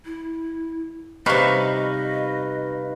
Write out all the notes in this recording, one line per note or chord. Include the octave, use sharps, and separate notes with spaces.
E4
C3 G3 D#4 B4 D#5 F5 C#6